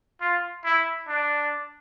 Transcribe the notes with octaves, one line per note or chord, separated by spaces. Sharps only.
F4
E4
D4